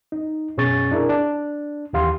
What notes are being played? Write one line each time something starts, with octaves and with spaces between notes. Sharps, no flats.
D#4
F#2 B2 C#4 G#4 C#6 A6
D4 E4 G#4 A#4
D4
D#2 E3 G4 F5 C6